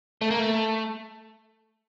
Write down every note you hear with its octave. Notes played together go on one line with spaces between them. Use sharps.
A3
A#3
A3